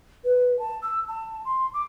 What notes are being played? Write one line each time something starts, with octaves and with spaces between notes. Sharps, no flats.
B4
A5
E6
A5
C6
D6